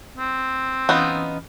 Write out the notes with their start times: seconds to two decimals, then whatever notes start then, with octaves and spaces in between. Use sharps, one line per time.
0.17 C4
0.89 E3 B3 C#4 D#4 F4 F6